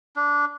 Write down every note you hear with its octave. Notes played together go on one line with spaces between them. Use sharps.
D4